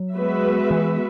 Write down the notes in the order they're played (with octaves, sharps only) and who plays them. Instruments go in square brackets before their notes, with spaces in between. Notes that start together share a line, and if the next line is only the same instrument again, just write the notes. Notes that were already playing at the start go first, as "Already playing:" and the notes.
Already playing: [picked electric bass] F#3
[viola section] G#3 B3 F#4 B4 E5
[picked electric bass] E3